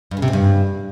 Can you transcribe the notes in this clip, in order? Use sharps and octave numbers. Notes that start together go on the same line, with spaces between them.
G2
C#3
C3
G#2
G2